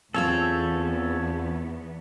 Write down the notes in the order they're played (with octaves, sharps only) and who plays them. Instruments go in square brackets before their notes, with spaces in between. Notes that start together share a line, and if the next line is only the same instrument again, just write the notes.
[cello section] E2 B3 [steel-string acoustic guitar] C4 F4 G#4 [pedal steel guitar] A4 C#5